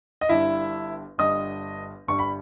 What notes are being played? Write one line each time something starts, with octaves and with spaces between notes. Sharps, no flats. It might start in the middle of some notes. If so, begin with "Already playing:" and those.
D#5
G1 G2 G3 E4 E5
G1 G2 G3 D#5 D#6
G1 G2 G3 C#6
B5